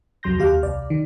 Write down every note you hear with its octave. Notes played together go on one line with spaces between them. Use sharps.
C2 F2 F#3 C6 G6 A#6
D#2 G4 F5 F6
C2 D5
D#3